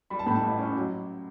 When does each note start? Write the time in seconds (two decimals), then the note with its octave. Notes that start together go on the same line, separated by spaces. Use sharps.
0.10 G3 B5
0.19 A5
0.27 A2 B5
0.35 A5
0.43 A1
0.59 C#4
0.76 F#3